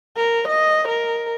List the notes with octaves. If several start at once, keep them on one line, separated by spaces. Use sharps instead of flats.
A#4
D#5
A#4